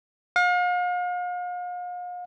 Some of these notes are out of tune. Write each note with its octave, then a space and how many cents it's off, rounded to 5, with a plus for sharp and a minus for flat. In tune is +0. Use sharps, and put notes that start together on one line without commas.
F5 +40